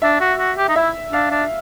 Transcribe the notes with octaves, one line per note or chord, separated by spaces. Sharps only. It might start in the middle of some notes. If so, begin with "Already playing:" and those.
D4 E5
F#4
F#4
G4
D#4
E4 E5
D4 F5
D4